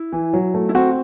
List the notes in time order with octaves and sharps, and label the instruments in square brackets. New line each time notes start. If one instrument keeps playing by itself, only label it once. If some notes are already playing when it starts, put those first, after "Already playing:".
Already playing: [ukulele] E4
[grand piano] E3
F#3
A3
[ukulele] E4
[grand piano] C4 [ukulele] F#4